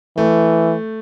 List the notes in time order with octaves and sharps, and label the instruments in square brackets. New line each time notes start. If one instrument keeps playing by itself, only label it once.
[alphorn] E3 [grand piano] A3